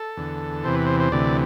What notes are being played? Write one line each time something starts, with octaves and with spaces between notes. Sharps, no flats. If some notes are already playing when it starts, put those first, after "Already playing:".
Already playing: A4
E2 D3
E2 C3 E3 C5
B4
C5
C5
D2 C3 E3 D5